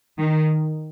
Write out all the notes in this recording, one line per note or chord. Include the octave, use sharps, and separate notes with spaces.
D#3